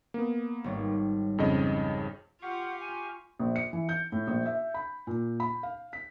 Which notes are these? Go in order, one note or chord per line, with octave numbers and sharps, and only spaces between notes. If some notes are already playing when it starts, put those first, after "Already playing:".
A#3 B3
G#1 G3 C#5
F2 C#3 D#5
F4 G4 F5 F#5 C#6
G#5
A#1
C#7
E3
G6
A2
A#1
E5
B5
A#2
B5
F5
B6